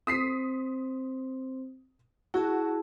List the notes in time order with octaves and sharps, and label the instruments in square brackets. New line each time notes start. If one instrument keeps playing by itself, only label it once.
[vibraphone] C4 C5 [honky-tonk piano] D#6 B6 C7
[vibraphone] E4 G#4 A5 [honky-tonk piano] F#4